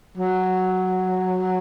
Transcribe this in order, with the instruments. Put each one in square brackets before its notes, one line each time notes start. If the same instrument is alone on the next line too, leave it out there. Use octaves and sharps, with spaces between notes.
[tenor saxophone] F#3